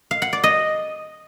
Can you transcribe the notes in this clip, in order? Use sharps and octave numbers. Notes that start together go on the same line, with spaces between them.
F5
F#5
D5
D#5